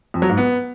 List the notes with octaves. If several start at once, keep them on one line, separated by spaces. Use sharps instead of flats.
F2
F#3
G#2
B3